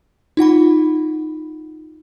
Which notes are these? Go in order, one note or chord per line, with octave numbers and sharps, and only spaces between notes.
D#4 F4 F#5 B5